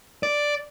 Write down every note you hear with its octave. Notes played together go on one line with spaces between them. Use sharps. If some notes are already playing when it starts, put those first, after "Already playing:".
D5